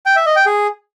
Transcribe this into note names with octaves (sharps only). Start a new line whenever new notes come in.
G5
E5
D#5
G5
G#4